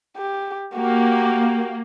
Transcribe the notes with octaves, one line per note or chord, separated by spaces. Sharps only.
G4
A#3 F#4 G4